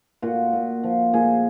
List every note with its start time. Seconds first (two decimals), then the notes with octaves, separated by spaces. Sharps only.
0.22 A#2 F#4
0.53 A#2
0.84 F3
1.13 A#2 G#4